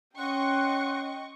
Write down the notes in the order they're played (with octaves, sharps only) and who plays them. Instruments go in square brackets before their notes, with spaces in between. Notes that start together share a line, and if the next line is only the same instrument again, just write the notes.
[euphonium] C#4 [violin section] D#5 C#6 [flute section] F#5 C6 F#6 [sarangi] G5